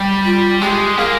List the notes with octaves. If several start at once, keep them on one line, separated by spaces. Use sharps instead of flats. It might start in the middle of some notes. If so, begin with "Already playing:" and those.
Already playing: G3
F4
G#3 G4
A#3 G#4